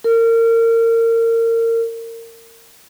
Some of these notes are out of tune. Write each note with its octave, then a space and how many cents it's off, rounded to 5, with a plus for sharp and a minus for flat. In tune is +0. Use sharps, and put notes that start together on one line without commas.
A#4 -30